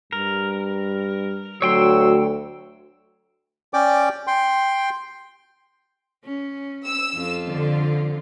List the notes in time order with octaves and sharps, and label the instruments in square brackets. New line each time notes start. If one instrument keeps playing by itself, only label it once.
[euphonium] G2 [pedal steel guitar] A#4
[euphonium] D2 [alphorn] F#3 [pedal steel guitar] C#5 G5 C6 [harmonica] E6
[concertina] C#4 D5 G5 D6
G5 C6
[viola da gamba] C#4
[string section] E6
[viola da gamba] F2 F4
[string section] D3